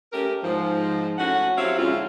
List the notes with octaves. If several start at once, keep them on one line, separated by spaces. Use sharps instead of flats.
A3 C#4 G4 A#4
G#2 F3
A2 C#4 F#4 F#5
F#3 C4 G4 C#5 E5 F5
F2 G#2 D3 C#4 E4 F4